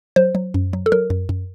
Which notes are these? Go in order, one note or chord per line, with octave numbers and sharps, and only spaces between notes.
F#3 C5
F#3
F#2
F#3
A4
F#3 A#4
F#2
F#2